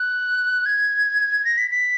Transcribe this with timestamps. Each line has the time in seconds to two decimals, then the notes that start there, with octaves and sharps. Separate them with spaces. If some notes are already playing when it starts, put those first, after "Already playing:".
Already playing: F#6
0.66 G#6
1.45 A#6
1.58 B6
1.71 B6